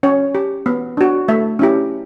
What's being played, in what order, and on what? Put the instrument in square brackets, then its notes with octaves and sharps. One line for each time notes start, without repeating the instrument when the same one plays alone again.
[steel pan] C#4 C#5
G4
B3
D4 F#4
A3 E5
C#4 E4 G4